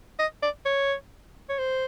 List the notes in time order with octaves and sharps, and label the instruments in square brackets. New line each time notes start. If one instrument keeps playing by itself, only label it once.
[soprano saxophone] D#5
D5
C#5
C#5
C5